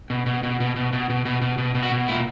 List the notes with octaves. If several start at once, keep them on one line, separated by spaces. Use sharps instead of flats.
B2
B2
B2
B2
B2
B2
B2
B2
B2
B2
B2
F#4
B2
A#2 E4